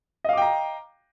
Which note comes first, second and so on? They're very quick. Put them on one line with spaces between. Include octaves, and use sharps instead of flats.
D#5 F5 D6 G5 A#5